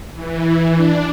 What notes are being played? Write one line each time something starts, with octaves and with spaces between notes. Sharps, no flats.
E3
D4